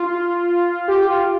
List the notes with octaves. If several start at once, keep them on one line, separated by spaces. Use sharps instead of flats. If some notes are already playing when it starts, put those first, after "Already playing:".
Already playing: F4
G4
F4